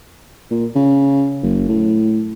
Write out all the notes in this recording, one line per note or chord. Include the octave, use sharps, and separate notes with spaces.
A#2
C#3
F#1
A2